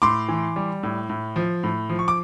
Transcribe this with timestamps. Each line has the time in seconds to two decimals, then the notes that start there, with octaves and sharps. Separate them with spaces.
0.02 A2 C6 D6
0.28 E3
0.56 G3
0.83 A2
1.10 A2
1.36 F3
1.64 A2
1.89 F3
1.99 C#6
2.08 D6